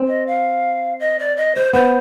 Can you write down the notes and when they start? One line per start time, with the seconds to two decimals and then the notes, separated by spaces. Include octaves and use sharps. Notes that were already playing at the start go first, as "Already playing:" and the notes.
Already playing: C4
0.08 D#5
0.27 F5
1.00 D#5
1.19 D5
1.37 D#5
1.55 C5
1.73 B3 C5